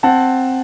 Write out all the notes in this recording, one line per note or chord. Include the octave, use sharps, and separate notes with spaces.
C4 F#5 A5